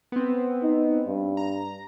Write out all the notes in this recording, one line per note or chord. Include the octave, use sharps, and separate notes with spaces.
B3 C4
D#4
G2
A#5